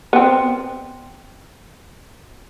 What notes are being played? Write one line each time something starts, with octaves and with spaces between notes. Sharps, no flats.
B3 C4